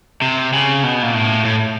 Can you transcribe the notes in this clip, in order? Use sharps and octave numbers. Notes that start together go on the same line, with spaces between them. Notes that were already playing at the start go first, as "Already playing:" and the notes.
C3
C#3
B2
A#2
A2
A2